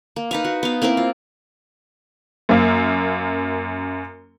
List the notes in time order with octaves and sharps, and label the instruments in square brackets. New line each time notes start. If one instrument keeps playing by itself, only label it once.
[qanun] A#3
D#4 B4 F5
F#4
B3 F5
A#3 C4 E4 A#4
F4
[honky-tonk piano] F#2 A#3